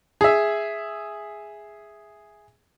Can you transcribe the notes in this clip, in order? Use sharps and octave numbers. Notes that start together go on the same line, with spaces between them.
G#4 E5